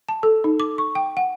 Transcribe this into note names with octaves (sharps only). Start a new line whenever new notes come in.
A5
A4
D#4
D6
C#6
G5
F#5